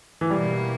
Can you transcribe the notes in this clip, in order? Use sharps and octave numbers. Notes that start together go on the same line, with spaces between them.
E3
B2 G3 A#3 E4